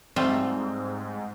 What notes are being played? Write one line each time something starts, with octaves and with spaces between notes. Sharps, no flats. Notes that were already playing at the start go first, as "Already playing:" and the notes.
G#2 G3 A3 C4 F4